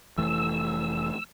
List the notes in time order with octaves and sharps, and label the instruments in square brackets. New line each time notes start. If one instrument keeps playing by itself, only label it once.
[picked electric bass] F1 E3 A3 [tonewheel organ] E6